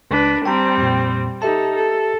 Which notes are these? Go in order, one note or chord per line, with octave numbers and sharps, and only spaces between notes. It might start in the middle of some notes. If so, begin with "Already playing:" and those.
C#2 D4 B4
G3 C4 G5 A5 A#5
F2 A#2
D#4 G4 A4 E5 A5
A4